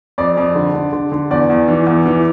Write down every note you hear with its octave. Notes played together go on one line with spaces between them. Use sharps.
F2 D5
F2
D3
D3
D3
D3
E2 D5
E2
E3
E2
E3